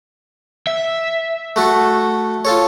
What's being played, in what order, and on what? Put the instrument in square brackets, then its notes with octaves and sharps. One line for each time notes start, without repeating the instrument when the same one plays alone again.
[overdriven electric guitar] E5
[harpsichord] A3 F#4 A4
F4 A4 C#5